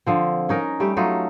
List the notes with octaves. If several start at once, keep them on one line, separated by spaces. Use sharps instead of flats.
D3 F3 C4
C#4 D#4 A#4
G3 A3 G4
F#3 A3 D#4 F4